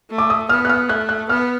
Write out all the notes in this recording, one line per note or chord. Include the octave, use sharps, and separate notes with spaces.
A3
D6
D#6
B3 F6
F#6
F6
A3 F#6
F#6
B3 F6